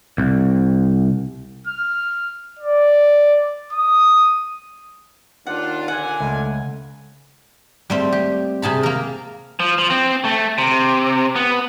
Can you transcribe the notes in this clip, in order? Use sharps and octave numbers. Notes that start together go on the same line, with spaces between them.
C2
F6
D5
D#6
D#2 D4 F4 F#5
A#2 D3 F#5 G#5
C#2 A3
G3 A3 C4
G4
C3 G#4 A5 B5
A#3 A#4
F3
F3
C4
A3
C3
B3